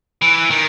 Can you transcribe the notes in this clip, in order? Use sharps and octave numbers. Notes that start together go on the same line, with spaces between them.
E3
D#3